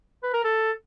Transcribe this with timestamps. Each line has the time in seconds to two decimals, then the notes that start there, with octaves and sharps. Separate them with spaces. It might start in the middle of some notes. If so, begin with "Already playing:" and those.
0.23 B4
0.34 A#4
0.44 A4